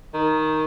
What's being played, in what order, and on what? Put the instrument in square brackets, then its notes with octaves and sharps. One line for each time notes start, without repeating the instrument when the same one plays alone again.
[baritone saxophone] D#3